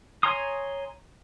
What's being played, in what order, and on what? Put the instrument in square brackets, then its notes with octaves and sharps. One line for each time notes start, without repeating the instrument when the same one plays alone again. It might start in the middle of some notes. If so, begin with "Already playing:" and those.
[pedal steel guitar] C#5 G#5 A#5 C6 D#6